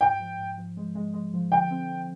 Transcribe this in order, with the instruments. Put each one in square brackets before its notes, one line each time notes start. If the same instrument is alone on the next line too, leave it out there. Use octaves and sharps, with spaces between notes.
[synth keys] G#2 [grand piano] G5
[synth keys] F3
G#2
F3
G#3
G#3
G#3
F3
[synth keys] D3 [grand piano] G5
[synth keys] C4
C4